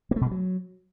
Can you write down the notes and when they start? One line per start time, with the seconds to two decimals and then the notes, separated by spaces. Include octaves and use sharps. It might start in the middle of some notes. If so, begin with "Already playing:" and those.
0.11 A#3
0.16 A3
0.21 B2
0.26 G#3
0.31 F#3